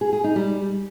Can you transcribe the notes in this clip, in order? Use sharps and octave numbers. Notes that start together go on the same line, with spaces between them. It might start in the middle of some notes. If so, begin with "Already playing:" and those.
G#4
G#4
D#4
G3